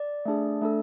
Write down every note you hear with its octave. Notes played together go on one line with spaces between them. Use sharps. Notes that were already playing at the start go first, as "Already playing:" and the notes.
Already playing: D5
A3 D4 G#4
A3 D4 A4